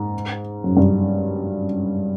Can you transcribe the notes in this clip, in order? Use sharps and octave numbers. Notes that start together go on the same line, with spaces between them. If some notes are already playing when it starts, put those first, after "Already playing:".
Already playing: G#2
F#2
G2